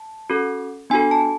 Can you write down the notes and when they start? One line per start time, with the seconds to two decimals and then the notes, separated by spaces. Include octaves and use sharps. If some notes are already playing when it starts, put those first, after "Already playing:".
Already playing: A5
0.30 C#4 F#4 A4
0.90 B3 D4 F#4 A4 G#5
1.11 A5